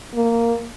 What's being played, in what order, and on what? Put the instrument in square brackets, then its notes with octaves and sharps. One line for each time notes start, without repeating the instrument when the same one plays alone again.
[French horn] A#3